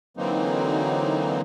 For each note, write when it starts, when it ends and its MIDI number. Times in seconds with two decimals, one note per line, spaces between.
0.17 1.41 50
0.17 1.41 52
0.17 1.41 54
0.17 1.41 58
0.17 1.41 60
0.17 1.41 63